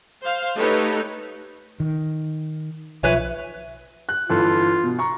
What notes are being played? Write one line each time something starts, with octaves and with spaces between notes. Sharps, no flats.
C5 F5
A3 D#4 G4 A4 B4 C#5
D#3
B1 F3 B4 C#5 E5 G#5
F#6
G1 E3 F4 A4
B2
A#5 C#6